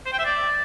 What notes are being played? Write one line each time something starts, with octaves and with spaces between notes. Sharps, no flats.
C5
G5
E5
D5